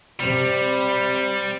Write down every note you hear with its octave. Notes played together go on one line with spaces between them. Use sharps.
C3 G3